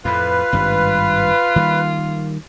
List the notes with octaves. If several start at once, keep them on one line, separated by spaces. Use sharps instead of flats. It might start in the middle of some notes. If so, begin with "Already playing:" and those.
F2 A2 F4 B4
G#1 G2 G3
D#3 G3 A#3